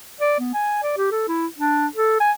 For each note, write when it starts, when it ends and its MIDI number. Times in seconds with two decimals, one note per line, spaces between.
0.21 0.36 74
0.39 0.53 59
0.54 0.81 80
0.83 0.95 74
0.97 1.10 67
1.12 1.24 69
1.28 1.46 64
1.58 1.87 62
1.96 2.18 69
2.20 2.32 80